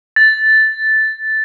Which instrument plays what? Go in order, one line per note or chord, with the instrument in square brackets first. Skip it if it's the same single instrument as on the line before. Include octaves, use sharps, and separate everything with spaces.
[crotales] A6